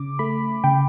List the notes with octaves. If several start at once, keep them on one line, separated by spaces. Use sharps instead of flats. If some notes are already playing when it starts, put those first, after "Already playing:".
Already playing: C#3 D6
A3 B5
C#3 G5